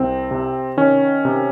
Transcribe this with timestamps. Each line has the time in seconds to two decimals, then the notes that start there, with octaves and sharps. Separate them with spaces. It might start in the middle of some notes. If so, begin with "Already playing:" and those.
Already playing: C2 C4
0.31 C3
0.77 D#3 C#4
1.25 C3